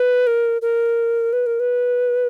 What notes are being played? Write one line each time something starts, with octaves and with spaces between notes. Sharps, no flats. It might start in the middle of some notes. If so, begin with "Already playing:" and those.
Already playing: B4
A#4
A#4
B4
A#4
B4